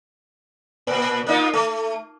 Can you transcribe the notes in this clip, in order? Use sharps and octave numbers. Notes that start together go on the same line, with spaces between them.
A#2
A#3 D#4 F4
A3